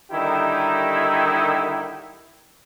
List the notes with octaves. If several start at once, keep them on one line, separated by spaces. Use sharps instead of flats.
D3 D#3 G3 D#4 E4 G4